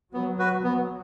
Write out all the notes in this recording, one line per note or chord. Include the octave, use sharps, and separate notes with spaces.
F#3 B3
F#4 B4
F#3 B3